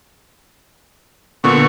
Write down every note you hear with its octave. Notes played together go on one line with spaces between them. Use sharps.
A#2 D3 B3 C#6